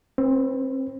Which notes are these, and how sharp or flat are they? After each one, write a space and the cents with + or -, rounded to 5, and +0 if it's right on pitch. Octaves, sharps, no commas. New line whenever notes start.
C4 +30 B4 +0